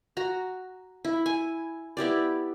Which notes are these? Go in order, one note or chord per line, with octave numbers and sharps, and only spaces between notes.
F#4 A#5
E4
G#5
B3 E4 G4 D5